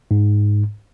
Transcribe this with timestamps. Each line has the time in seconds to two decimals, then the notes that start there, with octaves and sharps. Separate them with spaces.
0.11 G#2